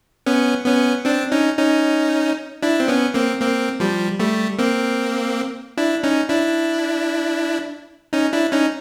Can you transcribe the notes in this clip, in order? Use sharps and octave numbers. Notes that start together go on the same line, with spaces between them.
B3 C#4
B3 C#4
C4 D4
C#4 D#4
C#4 D#4
D4 E4
C4
B3 C#4
A#3 C4
A#3 C4
F3 G3
G3 A3
A#3 C4
D4 E4
C#4 D#4
D4 E4
C#4 D#4
D4 E4
C#4 D#4